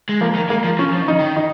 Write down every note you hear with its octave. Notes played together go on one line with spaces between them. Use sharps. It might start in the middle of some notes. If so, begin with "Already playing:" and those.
G#3
F3 A#3
D#3
G#3 A#3
F3
F3 C#4
F3
D#3
C#3 D#4
D#3
D#4